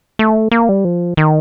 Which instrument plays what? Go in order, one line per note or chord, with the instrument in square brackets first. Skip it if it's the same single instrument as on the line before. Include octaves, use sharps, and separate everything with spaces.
[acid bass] A3
A#3
G3
F3
D#3